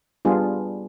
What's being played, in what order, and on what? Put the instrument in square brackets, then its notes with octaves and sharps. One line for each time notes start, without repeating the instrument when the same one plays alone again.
[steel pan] G3 B3 D4 F4 G#4